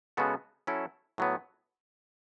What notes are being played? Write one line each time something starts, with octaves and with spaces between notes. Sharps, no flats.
C#3 G#3 B3 F#4 A4
F#3 C#4 E4 A4
A2 F#3 B3